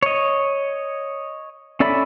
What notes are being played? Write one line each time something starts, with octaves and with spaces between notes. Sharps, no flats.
C#5 D#5
C#4 A4 D5 E5 B5